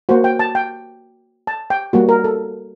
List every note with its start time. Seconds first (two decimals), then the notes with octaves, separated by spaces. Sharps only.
0.09 A#3 F#4 C5
0.24 G5
0.39 A5
0.55 G5
1.47 A5
1.70 G5
1.93 G3 A#3 F#4
2.09 A#4
2.24 A4